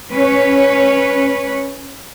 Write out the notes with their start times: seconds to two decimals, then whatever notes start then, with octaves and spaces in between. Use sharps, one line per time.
0.12 C#4 B4 C#5